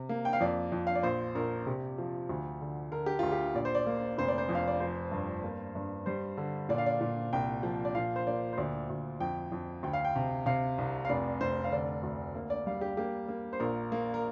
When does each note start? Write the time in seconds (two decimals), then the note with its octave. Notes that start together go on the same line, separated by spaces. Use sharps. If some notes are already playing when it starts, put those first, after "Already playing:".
Already playing: C3
0.09 A#3
0.25 G5
0.33 F5
0.40 F2 D5
0.72 F2
0.87 F5
0.95 D5
1.03 A#1 C5
1.35 A#1 A#4
1.66 C3 G4
1.98 F3
2.29 D2
2.61 D3
2.92 D3 A#4
3.06 G4
3.19 D2 F4
3.32 G4
3.55 A#1 D5
3.65 C5
3.75 D5
3.86 A#3
4.18 F1 C5
4.28 D5
4.38 C5
4.49 F2
4.55 F5
4.68 D5
4.80 F3 C5
5.12 G2
5.44 A#3
5.75 G2
6.06 G3 C5
6.37 D3
6.69 A#2 D5
6.78 F5
6.86 D5
7.01 A#2
7.33 C2 G5
7.63 F3
7.85 D5
7.95 A#2 F5
8.16 C5
8.27 A#3 D5
8.53 C5
8.58 D2 D5
8.90 D2
9.20 F2 G5
9.52 F2
9.83 D2 G5
9.93 F5
10.05 G5
10.15 C3
10.46 C3 F5
10.78 C2
11.05 F5
11.09 F1 D5
11.41 F1 C5
11.64 F5
11.72 D3 D5
12.03 D2
12.35 A#3
12.50 D5
12.66 G3 F5
12.81 G4
12.97 A#3 G4
13.28 A#3
13.53 C5
13.60 A#1 A#4
13.92 A#3
14.14 A#4